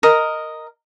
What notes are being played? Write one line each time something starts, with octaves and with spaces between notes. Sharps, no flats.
A#4 D#5